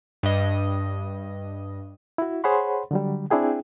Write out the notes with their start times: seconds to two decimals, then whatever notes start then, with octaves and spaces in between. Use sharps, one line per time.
0.23 G2 D#5
2.18 E4 F#4
2.44 G#4 C5 C#5 F#5 B5 C6
2.91 D3 F#3 G3
3.31 C4 D4 E4 G#4 G5